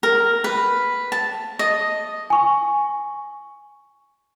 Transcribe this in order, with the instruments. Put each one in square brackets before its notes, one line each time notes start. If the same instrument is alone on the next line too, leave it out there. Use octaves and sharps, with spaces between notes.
[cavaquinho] A#4
B4
A5
D#5
[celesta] G#5 C#6